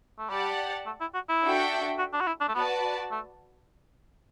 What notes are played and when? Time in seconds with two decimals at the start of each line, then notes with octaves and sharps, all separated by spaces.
0.18 A3
0.30 G3 G4 D5 F#5 A5
0.86 A3
1.01 E4
1.14 F#4
1.29 E4
1.43 D4 F#4 A4 E5 G5
1.99 F#4
2.13 D4
2.21 F#4
2.27 E4
2.41 D4
2.48 A3
2.55 B3 F#4 B4 D5 A5
3.11 A3